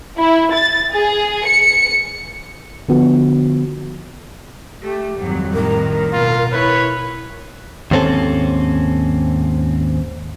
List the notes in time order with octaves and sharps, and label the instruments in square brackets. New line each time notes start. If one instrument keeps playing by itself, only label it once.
[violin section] E4
A6
G#4
C#7
[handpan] D3 F3 B3 F#4
[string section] A3 [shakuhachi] G4
[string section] G#1 F#3 [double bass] F2 G3
[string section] A2 D#3 [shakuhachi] A#4
[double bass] B2 [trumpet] F4
[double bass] E4 [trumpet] B4 [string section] C#5
[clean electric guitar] D#2 G#2 C4 C#4 A4